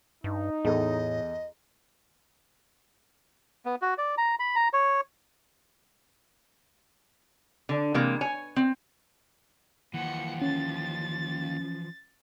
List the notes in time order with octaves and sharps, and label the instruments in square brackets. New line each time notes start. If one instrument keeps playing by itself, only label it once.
[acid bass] G2 [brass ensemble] D#4
[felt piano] E2 A4 [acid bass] A2 [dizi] D#5
[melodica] B3
F#4
D5
A#5
B5
A#5
C#5
[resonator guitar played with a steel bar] D3
C3 E3 G#3 A#3
C#5 G#5
C4
[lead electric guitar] D#2 [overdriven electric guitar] E3 F3 [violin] F#5 C#7
[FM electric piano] C#4 [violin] A6